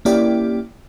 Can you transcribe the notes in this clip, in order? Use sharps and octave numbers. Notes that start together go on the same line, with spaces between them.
A#3 C#4 E4 G4 D5 G5